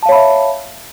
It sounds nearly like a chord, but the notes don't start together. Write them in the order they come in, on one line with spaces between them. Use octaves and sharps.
A5 F5 C#5 B5 E5